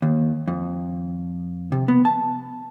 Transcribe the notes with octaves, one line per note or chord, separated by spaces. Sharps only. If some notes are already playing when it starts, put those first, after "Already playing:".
D#2
F2
C3
B3
A5